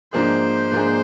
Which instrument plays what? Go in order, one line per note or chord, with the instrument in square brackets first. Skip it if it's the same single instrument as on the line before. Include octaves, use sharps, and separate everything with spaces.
[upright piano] G#2 F3 A#3 D4 G#4 [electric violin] C5
[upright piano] G#2 F3 A#3 D4 G#4